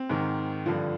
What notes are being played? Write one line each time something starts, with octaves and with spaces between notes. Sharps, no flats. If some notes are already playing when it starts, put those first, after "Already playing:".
Already playing: C4
G#2 D#3
G2 D3 F3